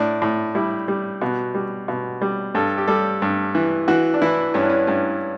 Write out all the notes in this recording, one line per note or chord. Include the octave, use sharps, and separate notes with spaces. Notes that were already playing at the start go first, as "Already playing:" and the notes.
Already playing: A2 D4
A2
G3 E4
G3
B2 F#4
G3
B2
G3
G2 A4
G4
G3 A4
G2
E3
E3 F#4
D4
E3 E4
G2 C#4
D4
C#4
G2 C#4